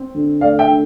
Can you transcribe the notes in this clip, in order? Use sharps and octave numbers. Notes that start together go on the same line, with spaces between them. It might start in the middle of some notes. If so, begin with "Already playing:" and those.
Already playing: C4
D3
A3 D5 F5
E5 G5
D3